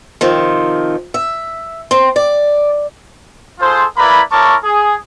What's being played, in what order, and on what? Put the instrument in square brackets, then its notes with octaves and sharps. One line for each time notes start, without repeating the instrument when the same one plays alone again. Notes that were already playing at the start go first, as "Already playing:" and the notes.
[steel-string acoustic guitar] C3 D#3 F3
E5
C4
D5
[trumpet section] F4 G#4 A4 C5
A#3 E4 B4 D5 A#5 B5
E4 A#4 C#5 A5 C#6 D6
G#4